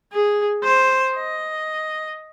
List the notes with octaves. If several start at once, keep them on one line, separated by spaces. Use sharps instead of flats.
G#4
C5
D#5